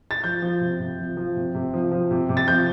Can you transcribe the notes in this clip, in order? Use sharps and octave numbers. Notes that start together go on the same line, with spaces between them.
A6
F3 G6
F3
C3
C3
F3
F3
C3
C3
F3
F3
C3
C3
A6
F3 G6